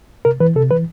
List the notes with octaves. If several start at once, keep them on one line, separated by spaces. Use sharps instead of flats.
C3 A#4
E3 B4
C3 A4
E3 B4